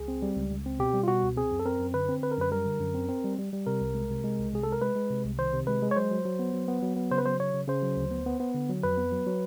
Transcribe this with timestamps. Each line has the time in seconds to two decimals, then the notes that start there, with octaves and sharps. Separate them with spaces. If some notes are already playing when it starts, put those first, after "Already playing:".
Already playing: C#2 G#4
0.08 C4
0.22 G3
0.36 C#2
0.51 C#2
0.66 C4
0.79 B2 G4
0.94 G3
1.03 F4
1.08 B2 F#4
1.23 C#2
1.37 C4 G#4
1.51 F#2
1.60 A4
1.66 C4 A#4
1.80 F#2
1.94 D3 B4
2.09 C4
2.23 D3 B4
2.31 A#4
2.38 F#2 B4
2.51 G3 A#4
2.66 D3
2.80 F#2
2.94 C4
3.09 C4
3.24 G3
3.38 G3
3.53 G3
3.67 C3 A#4
3.81 C2
3.95 G#3
4.10 C3
4.24 G#3
4.38 C2
4.53 C3 G#4
4.63 G#3 A4
4.73 A#4
4.82 G#3 B4
4.96 G#3
5.11 C3
5.25 C2
5.38 D#3 C5
5.53 C3
5.67 G#3 B4
5.82 G#3
5.91 C#5
5.96 F#3 C5
6.11 F#3
6.25 F#3
6.39 B3
6.54 F#3
6.68 B3
6.82 F#3
6.97 B3
7.11 C#3 C5
7.18 B4
7.26 F#3 C5
7.40 C#3 C#5
7.54 C#3
7.68 C#3 C5
7.82 F#3
7.97 D2
8.11 B3
8.26 B3
8.40 B3
8.54 D3
8.69 F#3
8.84 F2 B4
8.97 B3
9.12 F#3
9.27 F#3